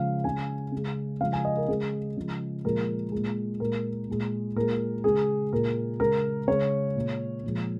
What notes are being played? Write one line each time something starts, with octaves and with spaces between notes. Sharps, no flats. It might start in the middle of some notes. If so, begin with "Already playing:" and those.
Already playing: C#3 F3 G#3 F5
C#3 G#3 G#5
C#3 G#3
C#3 F3 G#3 F5
G#5
D#5
A#4
C#3 G#3 G#4
C#3 F3 G#3
A#2 F3 G#3 A#4
A#2 G#3
A#2 G#3 A#4
A#2 G#3
A#2 G#3 A#4
C#3 G#3 G#4
A#2 G#3 A#4
C#3 G#3 A#4
C#3 G#3 C#5
A#2 G#3
A#2 F3 G#3